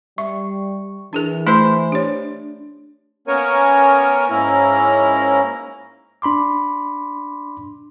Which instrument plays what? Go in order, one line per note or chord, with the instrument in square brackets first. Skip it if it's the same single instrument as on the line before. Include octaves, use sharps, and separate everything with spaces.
[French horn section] G3 [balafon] E5 [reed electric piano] C#6
[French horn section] E3 [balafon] D4 G#4 A#4
[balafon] A3 [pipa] E4 C5 [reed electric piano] C6
[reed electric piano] D4 [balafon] G4 C#5
[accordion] A#3 B3 C#4 A#4 C#5 G#5
G#2 A#3 C#4 E4 A#5
[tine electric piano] D4 B5 C6 D6